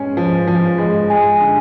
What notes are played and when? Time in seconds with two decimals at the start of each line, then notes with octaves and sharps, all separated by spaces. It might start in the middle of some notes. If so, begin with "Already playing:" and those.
Already playing: G#3 C#4
0.17 F3
0.48 F3
0.78 G#3
1.10 G#3 G#5
1.41 D3